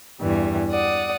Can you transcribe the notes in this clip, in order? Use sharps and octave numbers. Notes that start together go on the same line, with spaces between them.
E2 G2 E3 G3
D5 F#5 D#6